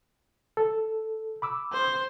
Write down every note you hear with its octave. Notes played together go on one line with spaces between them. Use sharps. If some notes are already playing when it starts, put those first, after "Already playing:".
A4
B5 D6 E6
C5